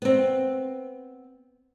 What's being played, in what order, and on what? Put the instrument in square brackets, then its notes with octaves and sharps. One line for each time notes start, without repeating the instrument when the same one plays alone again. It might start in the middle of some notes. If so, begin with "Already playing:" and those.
[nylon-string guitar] B3 C4